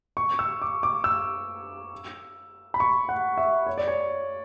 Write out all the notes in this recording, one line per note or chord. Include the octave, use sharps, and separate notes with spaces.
C#6
E6
D6
D6
E6
B5
C#6
F#5
E5
C#5
D5
C#5